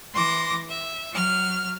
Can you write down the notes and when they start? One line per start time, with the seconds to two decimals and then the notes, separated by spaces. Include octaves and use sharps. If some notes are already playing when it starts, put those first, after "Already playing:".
0.13 E3 C6 D6 A#6
0.68 E5
1.12 F#3 F6